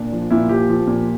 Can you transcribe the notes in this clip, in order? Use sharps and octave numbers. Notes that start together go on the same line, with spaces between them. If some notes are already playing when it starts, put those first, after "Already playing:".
Already playing: A#2 D4
F3
A#2 E4
F3 G4
F3
A#2